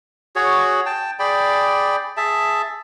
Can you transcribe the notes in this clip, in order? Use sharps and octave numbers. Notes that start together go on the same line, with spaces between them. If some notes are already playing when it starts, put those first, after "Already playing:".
F#4 G#4 C#5
G5 A5
G#4 D5 G5 B5
G#4 E5 A5